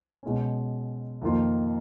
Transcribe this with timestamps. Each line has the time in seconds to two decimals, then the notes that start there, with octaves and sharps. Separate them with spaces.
0.23 B2 G#3 C#4
1.22 F2 D#3 A#3 F4